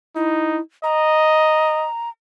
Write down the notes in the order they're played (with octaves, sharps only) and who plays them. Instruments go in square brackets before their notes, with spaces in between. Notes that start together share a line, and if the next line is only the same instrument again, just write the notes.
[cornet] D#4 [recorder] E4
[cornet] D#5 [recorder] A#5